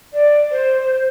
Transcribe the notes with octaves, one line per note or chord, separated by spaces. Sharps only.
D5
C5